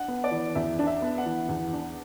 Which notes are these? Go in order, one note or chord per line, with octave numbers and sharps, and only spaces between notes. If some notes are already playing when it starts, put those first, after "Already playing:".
Already playing: D4 F#5
B3
D5
E3
E2 E5
D4
E5
B3
F#5
E3
E2
D4